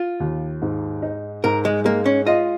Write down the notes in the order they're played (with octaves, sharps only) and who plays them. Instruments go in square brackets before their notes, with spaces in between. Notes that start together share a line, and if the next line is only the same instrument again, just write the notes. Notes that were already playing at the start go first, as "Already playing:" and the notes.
Already playing: [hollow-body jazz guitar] F4
[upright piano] D#2
G#2
D#4
[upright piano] G#2 [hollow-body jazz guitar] A#4
[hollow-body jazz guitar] G#3
[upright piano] G#3 [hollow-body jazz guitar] A#3
[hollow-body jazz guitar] C#4
[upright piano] F4 [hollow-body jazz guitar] D#5